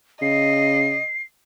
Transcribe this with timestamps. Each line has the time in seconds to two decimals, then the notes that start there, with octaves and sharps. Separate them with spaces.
0.22 C#3 D#5 C7